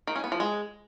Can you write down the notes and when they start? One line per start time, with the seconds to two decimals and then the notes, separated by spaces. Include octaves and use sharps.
0.07 D#3
0.16 C#4
0.24 B3
0.32 F3
0.40 G#3